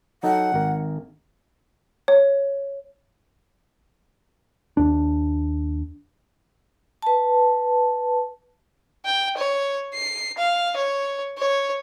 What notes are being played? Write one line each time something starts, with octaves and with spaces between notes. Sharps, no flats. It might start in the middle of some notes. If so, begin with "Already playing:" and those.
F#3 D#4 A4 F#5
G#1 A#4
C#5
D#2 D4
B4 A5
G5
C#5
C7
F5
C#5
C#5